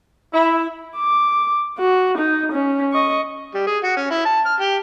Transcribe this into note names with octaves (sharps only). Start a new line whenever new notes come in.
E4
D6
F#4
D#4
C#4
D#5 C#6
G3
G#4
F#4
C#4
E4
A5
F6
G4